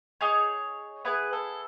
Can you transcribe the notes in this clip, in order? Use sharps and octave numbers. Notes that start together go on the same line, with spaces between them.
D#4 G#4 C#5
B3 E4 G#4 B4
A4